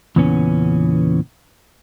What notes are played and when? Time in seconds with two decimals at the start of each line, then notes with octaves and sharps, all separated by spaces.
0.16 E2 A#2 C#3 E3 B3 C#4